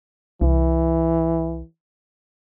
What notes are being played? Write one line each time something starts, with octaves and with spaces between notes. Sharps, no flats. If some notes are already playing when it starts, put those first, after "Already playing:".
C2 E3